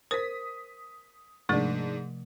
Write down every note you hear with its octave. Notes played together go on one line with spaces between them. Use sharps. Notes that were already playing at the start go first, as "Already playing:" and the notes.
A#4 C5 D#6 B6
G#2 C3 F3 A3 D4